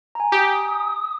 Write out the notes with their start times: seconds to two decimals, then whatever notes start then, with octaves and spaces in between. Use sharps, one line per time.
0.15 G#5 A#5
0.32 G4 D#6